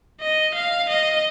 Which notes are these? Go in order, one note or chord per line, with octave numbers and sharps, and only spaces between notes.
D#5
F5
D#5